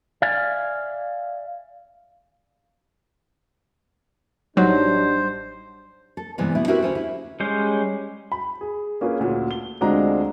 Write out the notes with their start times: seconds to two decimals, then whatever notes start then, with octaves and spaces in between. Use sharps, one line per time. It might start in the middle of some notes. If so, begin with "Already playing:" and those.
0.22 D5 E5 F5 G#5
4.57 A1 F#3 G3 D4 D#4 C5
6.17 A4
6.38 G2 C3 E3 G3 G#3 B3
6.55 B2 B3 E4
6.68 C4 E4 F#4 G4 A#4 B4
6.82 D2 C#4 C5
6.95 E4
7.40 G3 G#3 C#4 C5
8.32 B5
8.61 G#4
9.01 A#3 C#4 F4 G#4 B4
9.20 D2 A#2
9.51 G7
9.81 D2 G#3 C4 D4 F4 A#5